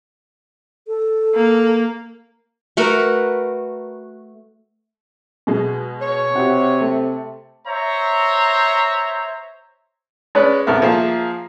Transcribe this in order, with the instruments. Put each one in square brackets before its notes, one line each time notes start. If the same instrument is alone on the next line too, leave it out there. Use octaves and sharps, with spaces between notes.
[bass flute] A4
[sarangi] A#3
[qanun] A3 F#4 A#4 B4
[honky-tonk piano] B2 G#3
[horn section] C#5
[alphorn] C3 [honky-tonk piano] F#4 G4
[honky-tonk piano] A3
[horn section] C5 C#5 E5 A#5
[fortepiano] G#3 C#4 B4 C#5 D5
C2 A3 B3 A#4 E5
F3 A#3 G#4 E5